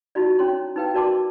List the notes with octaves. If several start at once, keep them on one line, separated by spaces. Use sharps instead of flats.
D#4 F4 F#4 D5
C#4 E4 C#5 C6
D#4 E4 B4 F5 G5
F#4 A#4 D5 A5 C6 D6